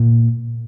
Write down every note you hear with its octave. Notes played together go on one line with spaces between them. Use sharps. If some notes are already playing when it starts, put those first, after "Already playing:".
Already playing: A#2